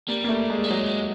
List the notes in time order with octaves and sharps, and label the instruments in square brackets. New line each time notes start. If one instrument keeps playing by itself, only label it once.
[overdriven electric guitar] G3 [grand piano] A#3
[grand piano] A#3
A3
G#3
[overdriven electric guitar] A3
[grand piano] F#3 [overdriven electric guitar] G#3